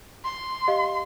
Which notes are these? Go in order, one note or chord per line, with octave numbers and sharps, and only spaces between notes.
C6
G4 D#5 F5